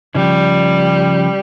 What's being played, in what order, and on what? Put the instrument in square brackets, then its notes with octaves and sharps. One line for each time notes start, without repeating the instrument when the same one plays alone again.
[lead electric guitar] C#3 F3 [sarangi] G3